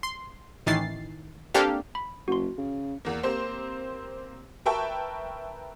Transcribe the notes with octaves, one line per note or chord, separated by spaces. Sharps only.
C6
A1 D#3 E3 A6 C7
A#3 C4 D4 G4 A4 F5
B5
F#1 F#4 C6
C#3
E2 A#3
A#3 C4 G4 C5
A#4 B4 E5 G5 A5 C#6